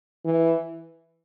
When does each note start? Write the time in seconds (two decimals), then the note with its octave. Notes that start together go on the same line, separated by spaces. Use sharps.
0.25 E3